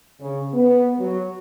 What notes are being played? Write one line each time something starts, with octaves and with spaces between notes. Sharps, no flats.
C#3
B3
F#3